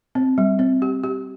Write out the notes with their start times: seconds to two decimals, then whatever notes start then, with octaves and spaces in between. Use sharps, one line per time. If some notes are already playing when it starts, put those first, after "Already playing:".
0.15 C4
0.38 G3
0.59 C4
0.82 G4
1.04 G4